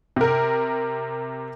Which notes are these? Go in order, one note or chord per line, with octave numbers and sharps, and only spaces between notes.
C3 A#4